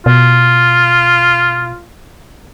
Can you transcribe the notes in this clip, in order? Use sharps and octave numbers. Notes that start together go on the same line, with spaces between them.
B2 F4